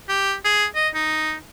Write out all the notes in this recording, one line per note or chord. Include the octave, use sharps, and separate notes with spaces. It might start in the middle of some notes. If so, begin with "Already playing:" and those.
G4
G#4
D#5
D#4